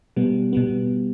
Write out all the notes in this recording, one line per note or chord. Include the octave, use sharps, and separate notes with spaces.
B2 G3 B3
B2 G3 B3